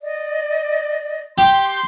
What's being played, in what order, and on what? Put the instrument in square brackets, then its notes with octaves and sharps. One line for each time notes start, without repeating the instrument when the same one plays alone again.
[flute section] D5 D#5
[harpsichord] G4 [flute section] C6 D6 G6